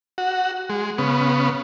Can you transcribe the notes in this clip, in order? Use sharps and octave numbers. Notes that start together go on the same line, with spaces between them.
F#4
G#3
C#3 B3